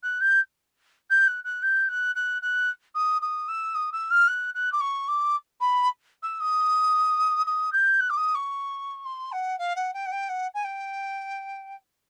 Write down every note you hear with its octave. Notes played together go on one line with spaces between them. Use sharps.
F#6
G6
G6
F#6
F#6
G6
F#6
F#6
F#6
D#6
D#6
E6
D#6
E6
F6
F#6
F#6
D6
C#6
D6
B5
E6
D#6
D#6
G6
F#6
D6
D#6
C#6
C6
F#5
F5
F#5
G5
F#5
G5
F#5
G#5
G5